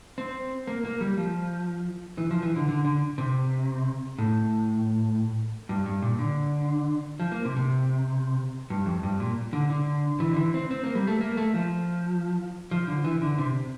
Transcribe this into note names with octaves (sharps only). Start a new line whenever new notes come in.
C4
A#3
A#3
G3
F3
E3
F3
E3
D3
D3
D3
C3
A2
G2
G2
A#2
D3
F3
A#3
C3
C3
G2
F2
G2
A#2
D3
D3
E3
D3
E3
C4
C4
A#3
G3
A3
A#3
A3
F3
F3
D3
E3
D3
C3